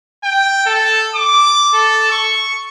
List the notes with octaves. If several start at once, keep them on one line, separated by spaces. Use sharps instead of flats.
G5
A4
D6
A4
C#6